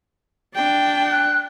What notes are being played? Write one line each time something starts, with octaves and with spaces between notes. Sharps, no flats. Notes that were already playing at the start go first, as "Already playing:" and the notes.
D4 G5
F#6